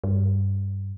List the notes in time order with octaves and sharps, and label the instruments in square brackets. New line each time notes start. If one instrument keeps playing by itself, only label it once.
[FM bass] G2